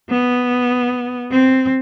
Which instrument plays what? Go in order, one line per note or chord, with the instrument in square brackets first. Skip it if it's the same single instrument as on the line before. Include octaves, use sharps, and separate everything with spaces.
[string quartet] B3
C4